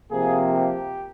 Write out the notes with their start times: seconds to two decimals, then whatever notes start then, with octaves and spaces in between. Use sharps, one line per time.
0.11 C3 F3 A#3 G#4
0.52 G4